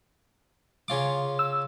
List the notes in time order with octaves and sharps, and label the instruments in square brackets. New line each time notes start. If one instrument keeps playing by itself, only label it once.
[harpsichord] C#3 F4 D6
[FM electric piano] E6